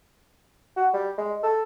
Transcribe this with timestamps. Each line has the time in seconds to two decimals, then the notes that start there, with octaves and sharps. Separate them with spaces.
0.77 F#4
0.94 G3
1.18 G#3
1.43 A4